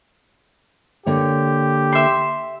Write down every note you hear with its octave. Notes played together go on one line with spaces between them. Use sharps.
D3 A#3 G4 C#5
E5 C6